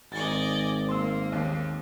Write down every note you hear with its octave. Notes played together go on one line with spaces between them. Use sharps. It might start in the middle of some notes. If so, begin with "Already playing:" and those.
G#1 D5 D#5 G#5 A6
A#3 C6 E6
D#2